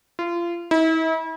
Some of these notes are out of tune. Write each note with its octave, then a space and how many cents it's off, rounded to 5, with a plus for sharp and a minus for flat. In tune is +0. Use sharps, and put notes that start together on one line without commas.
F4 -30
E4 -40